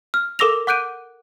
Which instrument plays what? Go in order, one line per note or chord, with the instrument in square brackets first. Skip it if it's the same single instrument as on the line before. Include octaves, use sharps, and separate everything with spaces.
[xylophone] F6
A4 A#4 D6 E6 A#6 F7
F#5 D6 F#6 G6 D7 D#7